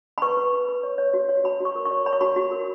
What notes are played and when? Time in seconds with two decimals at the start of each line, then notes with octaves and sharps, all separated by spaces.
0.18 B5
0.22 B4 C#6
0.37 B4
0.53 B4
0.68 B4
0.83 C#5
0.98 C#5
1.14 F#4
1.29 C#5
1.44 F#4 B5
1.60 F#4 C#6
1.75 A#4
1.85 C#6
1.91 C#5
2.06 C#5 B5
2.13 C#6
2.21 F#4 B5
2.36 F#4
2.52 A#4